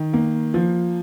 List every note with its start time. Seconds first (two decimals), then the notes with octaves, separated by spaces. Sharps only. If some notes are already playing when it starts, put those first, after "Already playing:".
Already playing: D#3
0.14 A#3
0.54 F3